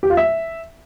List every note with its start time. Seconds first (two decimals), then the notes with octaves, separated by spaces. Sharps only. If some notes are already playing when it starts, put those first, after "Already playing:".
0.03 G4
0.10 F4
0.17 E5